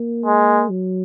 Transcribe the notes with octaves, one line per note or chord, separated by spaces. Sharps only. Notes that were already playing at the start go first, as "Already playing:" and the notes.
Already playing: A#3
G#3
F#3